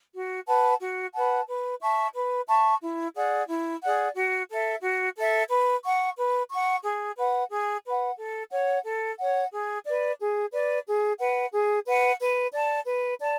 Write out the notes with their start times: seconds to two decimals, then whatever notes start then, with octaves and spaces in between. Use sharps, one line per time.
0.14 F#4
0.47 B4 F#5 A5
0.80 F#4
1.14 B4 F#5 A5
1.48 B4
1.81 E5 A5 C#6
2.15 B4
2.48 E5 A5 C#6
2.81 E4
3.16 G#4 D5 F#5
3.48 E4
3.82 G#4 D5 F#5
4.16 F#4
4.49 A4 E5
4.83 F#4
5.16 A4 E5
5.49 B4
5.84 F#5 C#6
6.16 B4
6.50 F#5 C#6
6.83 G#4
7.17 B4 F#5
7.50 G#4
7.84 B4 F#5
8.17 A4
8.51 C#5 F#5
8.84 A4
9.18 C#5 F#5
9.52 G#4
9.85 B4 D5
10.19 G#4
10.52 B4 D5
10.85 G#4
11.19 B4 F#5
11.52 G#4
11.86 B4 F#5
12.19 B4
12.53 D5 A5
12.87 B4
13.19 D5 A5